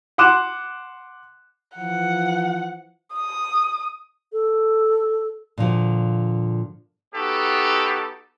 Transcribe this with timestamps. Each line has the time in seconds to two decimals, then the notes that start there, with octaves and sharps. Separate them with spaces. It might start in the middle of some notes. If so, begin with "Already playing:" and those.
0.18 F#5 C6 D6 F#6 E7
1.77 E3 F3 F#5
3.15 D#6
4.32 A4
5.58 A#2 D3 F3 F#4
7.14 B3 D#4 F#4 G4 A4